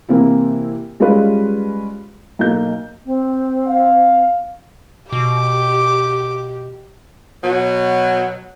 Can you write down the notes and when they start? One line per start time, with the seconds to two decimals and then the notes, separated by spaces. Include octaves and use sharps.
0.09 C3 E3 A#3 C4 E4
1.00 G3 G#3 C#4 F4 B4
2.39 B1 A#3 G6
3.06 C4
3.67 F5
5.12 B2 G4 D6
7.43 B2 F#3